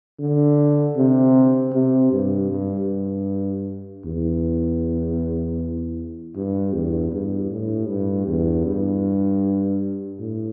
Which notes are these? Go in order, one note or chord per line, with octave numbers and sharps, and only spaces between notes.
D3
C3
C3
G2
G2
E2
G2
E2
G2
A2
G2
E2
G2
A2